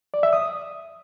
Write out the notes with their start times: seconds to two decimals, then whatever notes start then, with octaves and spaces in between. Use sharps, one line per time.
0.14 D5
0.23 E5
0.33 D#6